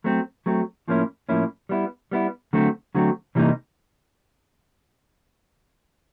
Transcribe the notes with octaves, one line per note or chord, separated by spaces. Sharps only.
F#3 A3 C4
F#3 A3 C4
A2 F3 A#3 C#4 E4
A2 F3 A#3 C#4 E4
G3 B3 E4
G3 B3 E4
D3 F#3 A3 C4
D3 F#3 A3 C4
C3 E3 G3 A#3 D#4